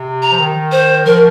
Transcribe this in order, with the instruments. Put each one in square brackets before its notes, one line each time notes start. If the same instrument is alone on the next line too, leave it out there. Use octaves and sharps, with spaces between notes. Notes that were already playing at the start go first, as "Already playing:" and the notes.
Already playing: [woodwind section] C3
[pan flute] A#5
[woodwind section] F3
D#3
[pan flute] C5
[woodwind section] F3 [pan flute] A#4